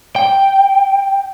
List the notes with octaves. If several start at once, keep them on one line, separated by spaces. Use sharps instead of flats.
G5